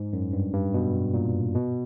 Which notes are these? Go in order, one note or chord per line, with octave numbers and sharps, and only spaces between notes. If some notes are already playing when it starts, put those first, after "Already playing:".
Already playing: G#2
F#2
G2
G2
B2
A#2
B2